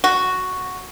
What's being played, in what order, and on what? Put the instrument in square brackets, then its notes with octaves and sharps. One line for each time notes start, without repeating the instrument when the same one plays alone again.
[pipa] F#4